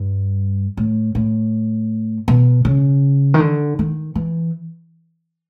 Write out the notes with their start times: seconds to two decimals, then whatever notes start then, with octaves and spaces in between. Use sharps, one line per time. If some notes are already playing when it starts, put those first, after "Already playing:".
Already playing: G2
0.77 A2
1.15 A2
2.28 B2
2.65 C#3
3.34 D#3
3.40 D3
3.79 D#3
4.15 E3